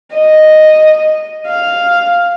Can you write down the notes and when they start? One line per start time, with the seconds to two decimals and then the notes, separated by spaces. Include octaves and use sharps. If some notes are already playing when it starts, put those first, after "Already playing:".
0.13 D#5
1.48 F5